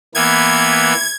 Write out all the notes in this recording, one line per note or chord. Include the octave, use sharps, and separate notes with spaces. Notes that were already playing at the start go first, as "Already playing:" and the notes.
E3 A#3 B3 G#6